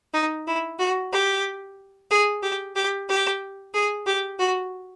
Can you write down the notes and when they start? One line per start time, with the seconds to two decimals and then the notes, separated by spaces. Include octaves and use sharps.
0.14 D#4
0.47 E4
0.79 F#4
1.12 G4
2.10 G#4
2.43 G4
2.76 G4
3.09 G4
3.74 G#4
4.06 G4
4.39 F#4